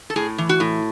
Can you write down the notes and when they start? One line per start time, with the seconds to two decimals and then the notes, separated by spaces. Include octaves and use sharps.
0.10 A4
0.16 A2 G#4
0.38 E3
0.49 F#4
0.60 A2